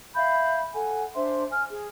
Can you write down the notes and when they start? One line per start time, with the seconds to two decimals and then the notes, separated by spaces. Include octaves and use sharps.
0.16 E5 F5 B5 G6
0.73 A4 F#5 G#5
1.14 D4 C5 E5 C6
1.50 G#5 F6
1.70 G#4